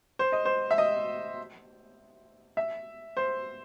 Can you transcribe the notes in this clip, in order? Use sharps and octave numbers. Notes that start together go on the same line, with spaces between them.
C5
D#5
C5
E5
D#5
E5
C5